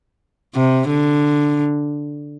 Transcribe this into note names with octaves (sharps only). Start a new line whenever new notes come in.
C3
D3